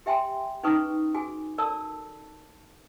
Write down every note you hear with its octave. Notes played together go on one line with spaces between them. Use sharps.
G4 E5 G5 G#5 C6
C#4 D#4 G#4 B4 C#6 D#6
F#4 G#4 G#5
A4 A#4 D5 A5 E6